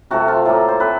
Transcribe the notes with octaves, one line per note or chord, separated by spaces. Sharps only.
C3 F3 A3 F#4
F4
A2 F#3 A#3
C5
F#3 A3 C4 B4